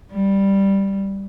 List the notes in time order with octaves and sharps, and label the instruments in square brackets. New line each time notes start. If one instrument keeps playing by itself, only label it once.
[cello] G3